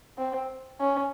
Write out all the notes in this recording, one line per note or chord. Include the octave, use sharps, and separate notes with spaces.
C4
C#4